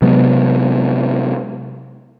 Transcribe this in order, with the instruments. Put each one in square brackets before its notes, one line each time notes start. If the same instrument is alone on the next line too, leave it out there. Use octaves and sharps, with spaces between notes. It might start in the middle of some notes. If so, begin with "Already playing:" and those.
[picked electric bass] C3 F#3 G#3 B3